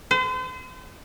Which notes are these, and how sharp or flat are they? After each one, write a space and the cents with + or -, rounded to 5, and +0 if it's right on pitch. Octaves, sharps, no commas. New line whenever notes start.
C5 -40